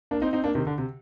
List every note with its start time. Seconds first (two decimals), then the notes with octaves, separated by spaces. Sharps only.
0.11 A#3 D4
0.22 C4 D#4
0.33 C4 D#4
0.44 A#3 D4
0.55 C3 D#3
0.67 D3
0.78 C3